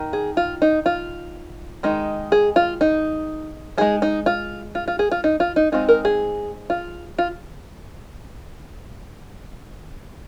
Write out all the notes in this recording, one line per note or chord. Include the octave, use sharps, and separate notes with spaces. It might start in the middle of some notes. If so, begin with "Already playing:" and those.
Already playing: D#3 D#4
G#4
F4
D#4
F4
D#3 G#3 D#4
G#4
F4
D#4
G#3 D#4 G#4
D#4
F4
F4
F4
G#4
F4
D#4
F4
D#4
G#3 C4 D#4 F4
A#4
G#4
F4
F4